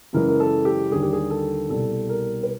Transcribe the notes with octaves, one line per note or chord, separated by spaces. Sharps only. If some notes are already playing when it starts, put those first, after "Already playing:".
F#2 C#3 E3 G#3 A#4
A#4
A4
G4
D#2 D3 G3 G#4
G4
G#4
A4
C2 B2 G3 A4
A#4
B4